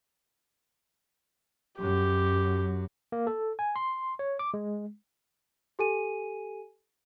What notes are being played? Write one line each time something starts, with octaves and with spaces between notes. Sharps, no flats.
F#2 F#3 G4
A#3
A4
G#5
C6
C#5
D6
G#3
G4 A4 G#5 D#7